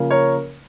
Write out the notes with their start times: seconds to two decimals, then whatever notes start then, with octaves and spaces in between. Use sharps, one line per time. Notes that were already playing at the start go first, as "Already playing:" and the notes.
Already playing: C#3 F3 A#3
0.11 A#4 C#5